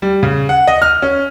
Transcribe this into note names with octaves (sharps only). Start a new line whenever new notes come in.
G3
C#3
F#5
D#5
F6
C#4